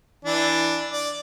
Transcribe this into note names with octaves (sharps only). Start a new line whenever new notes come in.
E3 D4
D5